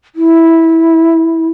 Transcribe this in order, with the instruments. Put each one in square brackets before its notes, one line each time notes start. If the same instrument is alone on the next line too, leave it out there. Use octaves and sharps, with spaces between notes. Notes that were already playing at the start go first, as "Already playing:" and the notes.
[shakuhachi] E4